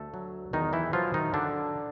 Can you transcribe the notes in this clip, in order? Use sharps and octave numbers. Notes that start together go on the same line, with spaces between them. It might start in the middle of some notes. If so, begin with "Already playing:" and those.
Already playing: D2 A3 A4
F#3
E2 D#3 D#4
E3 E4
F3 F#3 F4
D#3 D#4
D3 F#3 D4